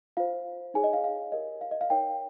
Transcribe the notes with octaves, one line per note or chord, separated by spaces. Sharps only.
F4 C5 F5
D#4 G#4 C#5 G#5
D#5
F5
F5
G4 A#4 C#5 D#5
F5
D#5
F5
D#4 A#4 C#5 G5